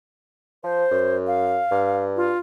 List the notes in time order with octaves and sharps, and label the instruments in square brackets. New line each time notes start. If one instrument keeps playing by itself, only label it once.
[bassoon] F3 [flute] C5
[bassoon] F#2
[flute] F5
[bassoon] G2
[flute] F4